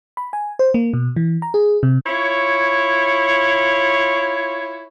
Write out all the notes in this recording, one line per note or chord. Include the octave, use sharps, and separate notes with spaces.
B5
G#5
C5
A#3
B2
E3
A#5
G#4
C3
E4 F4 C#5